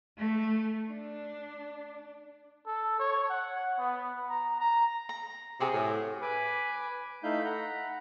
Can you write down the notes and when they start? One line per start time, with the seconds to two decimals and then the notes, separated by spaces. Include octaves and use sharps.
0.18 A3
0.87 D4
2.66 A4
2.99 C#5
3.29 F#5
3.78 B3
4.29 A#5
4.60 A#5
5.09 A#5
5.60 C3 F#4 G#4 G5
5.73 A2
6.22 B4 G#5 B5 D6
7.24 A3 D#4 E4 F5 B5 G6
7.45 F#5 A#5 B5